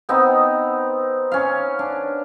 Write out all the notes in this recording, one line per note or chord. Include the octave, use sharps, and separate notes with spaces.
B3 C4 D#4
C#4 F5
D4